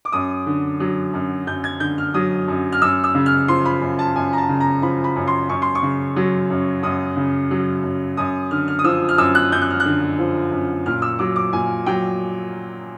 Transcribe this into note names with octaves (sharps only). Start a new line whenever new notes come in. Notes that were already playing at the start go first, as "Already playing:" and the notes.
D6
F#2 D#6
D3
F#3
F#2
F#2 G6
G#6
D3 G6
F6
F#3 D#6
F#2
F6
F#2 E6
E6
C#3
F6
F3 C6
B5
F#2
A5
F#2 G#5
A#5
A5
C#3
A#5
F3 B5
B5
F#2
C6
F#2 C#6
C6
C#6
C#3
F#3
F#2
F#2 D#6
C#3
F#3
F#2
F#2 D#6
D3 F6
F6
D#6
F3 E6
F6
F#2 E6
F#6
F#2 G6
F#6
F6
F#6
D3
F3
F#2
A#2 F6
E6
F#3 D6
D6
A#2 G#5
F#3 G5